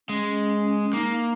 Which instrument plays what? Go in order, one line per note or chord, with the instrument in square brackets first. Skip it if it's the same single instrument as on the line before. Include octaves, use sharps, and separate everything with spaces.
[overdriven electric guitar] G#3 [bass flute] C#4
[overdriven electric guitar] A#3 [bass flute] D#4